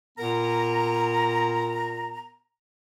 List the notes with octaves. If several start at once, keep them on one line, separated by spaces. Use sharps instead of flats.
A#2 B3 A#4 A#5